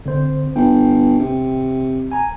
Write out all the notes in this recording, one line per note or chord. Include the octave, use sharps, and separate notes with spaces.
D3 C4 C5
G1 G5
C3
G#5 A#5